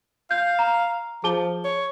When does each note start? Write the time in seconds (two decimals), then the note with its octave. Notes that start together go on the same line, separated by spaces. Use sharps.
0.31 F5 G6
0.59 A#5
1.24 F3 G#4 A5 G7
1.65 C#5